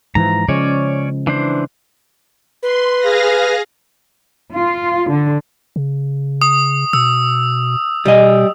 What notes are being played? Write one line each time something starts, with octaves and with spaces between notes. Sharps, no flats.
G#2 E3 F3 A#5
C#3 F3 G#3 C#4 C#5 D5
E3 D4 C5
B4 C6
G#4 F5 A#6
F4
D3
C#3
D#6
B2 E6
B2 G3 D#5